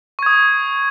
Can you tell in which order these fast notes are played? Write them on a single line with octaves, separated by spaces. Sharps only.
C#6 G#6 D#6